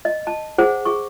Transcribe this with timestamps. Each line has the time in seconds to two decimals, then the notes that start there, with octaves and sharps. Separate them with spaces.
0.05 D#5
0.27 A5
0.58 G#4 C5 F#5
0.85 G#4 C#6